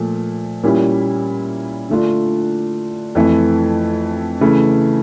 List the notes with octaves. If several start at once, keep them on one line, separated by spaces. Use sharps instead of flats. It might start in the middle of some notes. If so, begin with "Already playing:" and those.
Already playing: A#2 F3 A3
A#2 G3 A#3 C#4 E4
D3 A3 D4 F4
F2 E3 A3
C#3 E3 A3